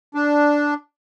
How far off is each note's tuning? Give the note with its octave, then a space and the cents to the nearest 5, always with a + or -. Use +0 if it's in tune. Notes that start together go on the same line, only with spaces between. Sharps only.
D4 -5